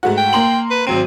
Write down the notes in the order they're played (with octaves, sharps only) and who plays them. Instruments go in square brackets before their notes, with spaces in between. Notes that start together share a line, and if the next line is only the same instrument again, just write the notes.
[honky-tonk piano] G#2 A3 F#4
[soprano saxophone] G5
[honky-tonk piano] A#3 C6 F#7
[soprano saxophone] B4
[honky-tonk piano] G#1 F#3 D#7 [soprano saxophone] C4